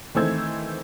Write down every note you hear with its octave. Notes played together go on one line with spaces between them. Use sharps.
D#3 E3 A3 C4 E6 G#6